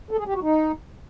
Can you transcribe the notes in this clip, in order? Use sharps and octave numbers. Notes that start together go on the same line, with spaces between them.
A4
G#4
G4
F#4
D#4